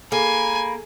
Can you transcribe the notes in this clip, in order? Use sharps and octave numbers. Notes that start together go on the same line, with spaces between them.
A#3 G#4 A4 G#5 B5